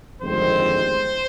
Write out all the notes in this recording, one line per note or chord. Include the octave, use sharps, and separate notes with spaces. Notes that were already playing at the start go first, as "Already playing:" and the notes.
G1 F2 D#3 G#3 C4 C5